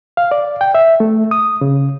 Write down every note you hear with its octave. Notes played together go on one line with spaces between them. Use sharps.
F5
D5
G5
E5
A3
D#6
C#3